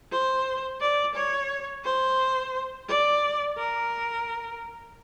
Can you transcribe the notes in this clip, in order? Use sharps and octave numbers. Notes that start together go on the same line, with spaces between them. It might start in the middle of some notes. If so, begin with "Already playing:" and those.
C5
D5
C#5
C5
D5
A#4